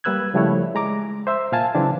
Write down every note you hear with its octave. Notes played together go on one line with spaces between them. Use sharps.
G3 A#3 B4 E6 F#6 G#6
C#3 F3 G3 A3 E4 C#5
G#3 A#5 D6
C5 E5 E6
A#2 F5 G#5 A5
C#3 E3 F#3 C4 D4